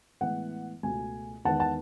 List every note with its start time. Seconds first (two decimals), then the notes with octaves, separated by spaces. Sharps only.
0.21 A2 E3 G#3 B3 F#5
0.83 C#2 B2 A3 G#5
1.45 E2 D#3 G#3 B3 F#5 A5
1.60 F#5 A5